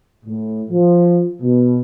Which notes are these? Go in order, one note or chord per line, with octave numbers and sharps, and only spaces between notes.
A2
F3
B2